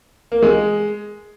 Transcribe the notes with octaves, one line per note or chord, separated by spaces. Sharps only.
A#3
G#3